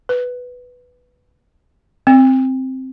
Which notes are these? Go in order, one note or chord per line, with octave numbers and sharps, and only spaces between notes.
B4
C4